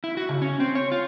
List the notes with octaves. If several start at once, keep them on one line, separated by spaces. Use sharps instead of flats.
E4
F#4
C#3
C#4
C4
C#5
F4